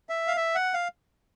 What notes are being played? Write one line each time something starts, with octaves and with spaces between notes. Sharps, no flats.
E5
F5
E5
F#5
F5